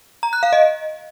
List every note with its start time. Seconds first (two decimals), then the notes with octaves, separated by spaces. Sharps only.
0.23 A#5
0.33 F#6
0.43 F5
0.53 D#5